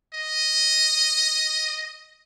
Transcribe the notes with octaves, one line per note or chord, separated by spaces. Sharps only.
D#5